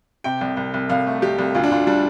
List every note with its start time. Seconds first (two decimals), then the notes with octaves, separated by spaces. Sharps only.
0.24 C3 G5
0.41 C2
0.57 C2
0.74 C2
0.89 C2 F5
1.07 A3
1.22 C2 G4
1.39 C2
1.55 D2 F4
1.64 D4
1.71 D2 F4
1.87 G3 D4